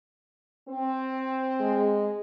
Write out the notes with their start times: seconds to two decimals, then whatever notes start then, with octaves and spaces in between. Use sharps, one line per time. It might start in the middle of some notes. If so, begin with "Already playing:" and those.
0.68 C4
1.60 G#3